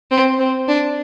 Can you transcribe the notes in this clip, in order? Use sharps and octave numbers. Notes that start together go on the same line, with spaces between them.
C4
C4
D4